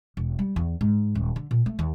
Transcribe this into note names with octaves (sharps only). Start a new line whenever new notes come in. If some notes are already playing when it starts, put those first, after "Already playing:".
E1
G3
E2
G#2
D#1
D3
A#2
A3
D#2